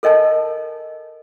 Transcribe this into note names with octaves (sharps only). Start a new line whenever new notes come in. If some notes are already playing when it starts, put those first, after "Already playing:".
A4 A#4 D#5 G#5 A5